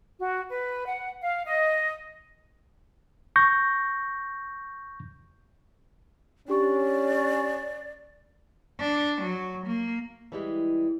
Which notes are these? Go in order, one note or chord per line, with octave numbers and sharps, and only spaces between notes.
F#4
B4
F#5
F5
D#5
C#6 G6 A#6
C#4 D4 G4 D5 C#6
D4
F#3
A#3
E3 G3 G#3